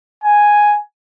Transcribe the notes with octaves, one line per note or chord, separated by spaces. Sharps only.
G#5